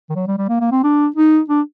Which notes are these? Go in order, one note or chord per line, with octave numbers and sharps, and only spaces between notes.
D#3
F#3
G3
G3
A#3
A#3
C4
D4
D#4
D4